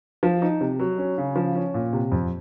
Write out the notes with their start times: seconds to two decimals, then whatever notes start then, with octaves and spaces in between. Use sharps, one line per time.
0.23 F3
0.42 D#4
0.61 C3
0.79 F#3
0.98 C#4
1.18 C#3
1.36 F3
1.55 C#4
1.74 A#2
1.93 C3
2.12 F2